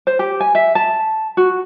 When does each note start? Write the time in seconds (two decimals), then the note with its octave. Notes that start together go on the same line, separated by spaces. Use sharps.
0.07 C5
0.19 G4
0.41 G#5
0.55 E5
0.75 A5
1.37 F#4